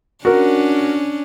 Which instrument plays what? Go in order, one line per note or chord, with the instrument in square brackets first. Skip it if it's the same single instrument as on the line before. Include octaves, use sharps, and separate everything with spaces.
[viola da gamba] C#4 D4 [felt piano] F#4 A#4